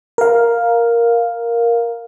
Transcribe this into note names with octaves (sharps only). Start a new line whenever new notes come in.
A#4 F5